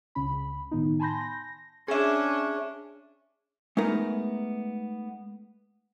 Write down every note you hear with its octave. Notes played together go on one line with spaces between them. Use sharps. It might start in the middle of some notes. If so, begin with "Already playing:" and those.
C#2 C#3 C#4 B5
A2 D#3 B3 D#4
G#5 A5 B5 C6 G6 A#6
A#6
C#4 D4 G#4 E5
G#3 A3 B3 D#4 A#4